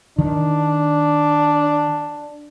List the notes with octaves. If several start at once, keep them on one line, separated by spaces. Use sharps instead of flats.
D#3 D4